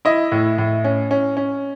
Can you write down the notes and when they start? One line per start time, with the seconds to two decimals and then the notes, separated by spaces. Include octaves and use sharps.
0.05 E4 D#5
0.32 A2
0.58 A2
0.84 C#4
1.11 C#4
1.37 C#4